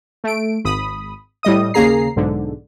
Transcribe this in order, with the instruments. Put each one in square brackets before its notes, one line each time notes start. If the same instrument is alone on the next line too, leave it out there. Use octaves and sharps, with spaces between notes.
[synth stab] A3 D7
G#1 B5 D#6
A2 G3 D#5 D#6
D#2 C#3 A#3 G#4 A#5 C7
B1 G#2 D3